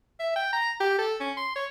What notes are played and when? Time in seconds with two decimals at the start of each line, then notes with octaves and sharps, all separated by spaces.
0.20 E5
0.36 G5
0.53 A#5
0.80 G4
0.98 A4
1.20 C#4
1.37 C6
1.56 C#5